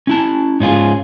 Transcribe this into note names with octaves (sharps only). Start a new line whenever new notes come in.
C#4 E4 A5
G#2 C#4 F4 G#4